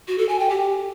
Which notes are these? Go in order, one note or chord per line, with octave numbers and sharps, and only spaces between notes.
F#4
A4
G#5
G5
G4